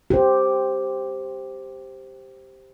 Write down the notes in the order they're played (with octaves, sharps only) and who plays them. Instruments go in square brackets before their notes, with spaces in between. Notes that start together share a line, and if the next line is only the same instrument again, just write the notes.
[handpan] G4 C5